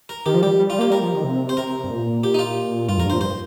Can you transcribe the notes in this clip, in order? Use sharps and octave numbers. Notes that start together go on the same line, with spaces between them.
A#4
D#3 G4
F3
G3 G4
G3
F4
A#3 G4
G3 A#4
F3
D#3
C3
C5
C3 A#4
G2
A#2
G4
D#4
F4
G2 F4
F2 A#4
G2
C5
A#2
G2 C5